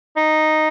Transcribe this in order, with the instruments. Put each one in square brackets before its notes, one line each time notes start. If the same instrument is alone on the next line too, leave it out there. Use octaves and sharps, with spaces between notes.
[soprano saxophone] D#4